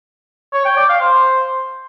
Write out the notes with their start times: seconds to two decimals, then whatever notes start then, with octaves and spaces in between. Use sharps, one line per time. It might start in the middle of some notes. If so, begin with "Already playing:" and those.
0.53 C#5
0.65 G5
0.77 D5
0.89 F5
1.01 C5